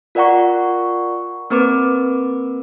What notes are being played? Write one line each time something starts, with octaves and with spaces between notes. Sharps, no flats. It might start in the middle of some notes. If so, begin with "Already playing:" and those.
F4 A#4 D5 F#5 A#5 C#6
A#3 C4 A#4 B4 D6